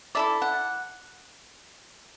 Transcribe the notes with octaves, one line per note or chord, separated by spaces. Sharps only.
E4 A4 D5 E5
F#5